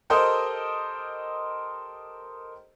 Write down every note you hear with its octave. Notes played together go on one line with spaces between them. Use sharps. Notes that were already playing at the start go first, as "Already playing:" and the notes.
G4 A4 A#4 C5 D#5